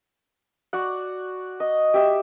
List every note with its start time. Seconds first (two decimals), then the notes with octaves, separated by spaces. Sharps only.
0.73 F#4 D5 F#5
1.60 D#5
1.94 G4 E5